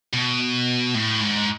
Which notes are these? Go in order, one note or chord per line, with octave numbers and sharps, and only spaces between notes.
B2
A2
G#2